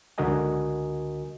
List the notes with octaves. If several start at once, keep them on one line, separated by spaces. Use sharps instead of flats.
C#2 D3 F#4 A#4 D#5 G#5